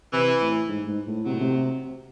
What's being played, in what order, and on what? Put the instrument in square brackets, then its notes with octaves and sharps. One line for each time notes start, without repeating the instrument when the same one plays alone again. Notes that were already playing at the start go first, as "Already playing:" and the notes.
[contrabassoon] C3 [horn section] E3
[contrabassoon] A2
G#2
G#2
A2
[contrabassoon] C3 [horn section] D#3 F#3
[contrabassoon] A2
C3